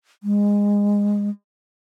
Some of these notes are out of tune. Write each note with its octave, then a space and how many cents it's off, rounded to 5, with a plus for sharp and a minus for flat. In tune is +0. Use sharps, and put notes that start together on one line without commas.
G#3 -20